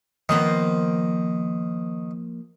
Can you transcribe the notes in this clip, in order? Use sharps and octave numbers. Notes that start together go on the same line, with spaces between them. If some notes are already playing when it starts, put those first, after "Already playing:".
D#3 F3 A#3 B3